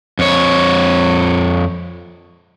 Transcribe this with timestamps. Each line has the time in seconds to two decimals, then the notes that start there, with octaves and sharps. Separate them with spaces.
0.19 F2 C#5